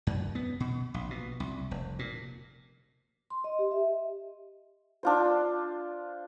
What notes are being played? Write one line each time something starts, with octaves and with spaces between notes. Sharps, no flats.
F#2
B3
B2
A#1
B2
C2
F1
A#2
C6
D#5
G4
E5
D4 F4 C5